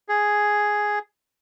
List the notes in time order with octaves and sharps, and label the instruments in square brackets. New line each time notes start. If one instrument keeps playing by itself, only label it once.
[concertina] G#4